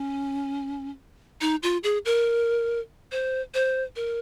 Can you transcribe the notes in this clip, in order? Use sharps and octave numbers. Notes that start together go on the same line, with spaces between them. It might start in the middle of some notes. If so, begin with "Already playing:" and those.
Already playing: C#4
D#4
F4
G#4
A#4
C5
C5
A#4